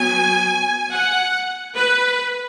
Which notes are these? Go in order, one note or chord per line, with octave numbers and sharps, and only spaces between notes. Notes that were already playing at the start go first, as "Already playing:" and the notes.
Already playing: F#3 B3 G#5
F#5
B4